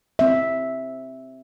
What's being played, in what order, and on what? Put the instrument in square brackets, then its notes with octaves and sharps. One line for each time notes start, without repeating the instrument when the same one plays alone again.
[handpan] C4 E5